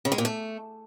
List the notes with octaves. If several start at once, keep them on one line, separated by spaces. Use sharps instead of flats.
C#3
G#3
A#2
A3